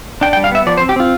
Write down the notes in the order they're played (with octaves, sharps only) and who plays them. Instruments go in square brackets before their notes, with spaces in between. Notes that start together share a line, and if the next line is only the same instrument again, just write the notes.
[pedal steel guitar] D4 G5
G5
G3
F5
B3 E5
F3 D5
C5
C4
G4
C4 F4